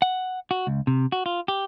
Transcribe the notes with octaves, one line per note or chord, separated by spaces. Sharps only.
F#5
F#4
C#2
C3
F#4
F4
G4